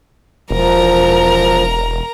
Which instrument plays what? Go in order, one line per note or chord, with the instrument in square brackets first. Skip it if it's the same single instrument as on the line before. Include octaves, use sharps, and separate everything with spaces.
[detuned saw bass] E1 [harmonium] F3 [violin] A#4 A#5